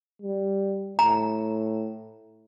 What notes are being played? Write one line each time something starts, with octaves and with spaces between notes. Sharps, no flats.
G3
A2 A#5